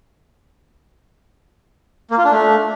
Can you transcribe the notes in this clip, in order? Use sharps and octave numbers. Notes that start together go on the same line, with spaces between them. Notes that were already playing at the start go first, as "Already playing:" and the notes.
A#3
F4
D4
A3